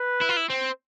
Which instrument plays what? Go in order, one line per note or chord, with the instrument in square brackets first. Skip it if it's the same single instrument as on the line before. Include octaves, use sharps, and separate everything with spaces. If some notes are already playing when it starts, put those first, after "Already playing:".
Already playing: [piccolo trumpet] B4
[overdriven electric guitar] E4
F4
E4
C4